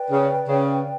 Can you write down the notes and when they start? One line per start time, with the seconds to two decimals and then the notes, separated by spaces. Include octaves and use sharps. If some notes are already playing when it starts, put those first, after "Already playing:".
Already playing: B4 D5 G5
0.11 C#3
0.48 C#3